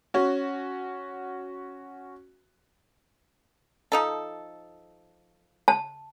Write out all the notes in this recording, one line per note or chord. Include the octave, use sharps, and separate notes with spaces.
C#4 F#4
F3 D#4 A4
A5